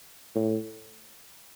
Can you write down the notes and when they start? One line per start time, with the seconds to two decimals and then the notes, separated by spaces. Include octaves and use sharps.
0.35 A2